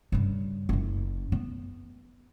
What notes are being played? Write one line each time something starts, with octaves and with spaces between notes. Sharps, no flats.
G2 C#3
F#1 F#2
B3